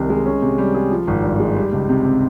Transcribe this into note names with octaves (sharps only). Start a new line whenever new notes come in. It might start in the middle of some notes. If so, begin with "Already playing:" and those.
Already playing: C2 C3 D#3
G#3
C#4
C3
G3
G#4
F3
G#1
G2
G#3
G3
C#2
C3
C4